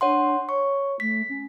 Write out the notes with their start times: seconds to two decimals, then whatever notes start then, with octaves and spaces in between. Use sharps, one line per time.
0.01 D4 C#5 F#5 C6
0.49 C#5 C#6
1.00 A3 B6
1.29 C#4